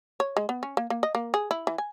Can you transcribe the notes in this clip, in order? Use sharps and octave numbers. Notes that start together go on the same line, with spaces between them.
C#5
G#3
B3
C#4
A#3
A#3
D#5
A#3
G#4
E4
E3
G#5